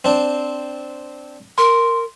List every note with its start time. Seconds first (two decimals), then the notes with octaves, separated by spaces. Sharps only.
0.05 C4 D4
1.58 A#4 C6